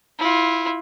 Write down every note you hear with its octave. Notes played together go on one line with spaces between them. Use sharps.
E4 F4